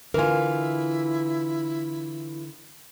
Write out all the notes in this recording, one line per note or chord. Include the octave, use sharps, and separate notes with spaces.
D3 E3 E4 F4 A#4 G#5